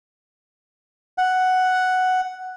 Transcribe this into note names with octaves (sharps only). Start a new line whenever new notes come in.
F#5